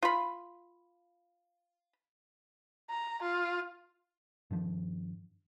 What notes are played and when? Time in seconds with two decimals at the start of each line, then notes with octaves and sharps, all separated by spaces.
0.02 F4 B5
2.90 A#5
3.22 F4
4.51 G2 D#3 F3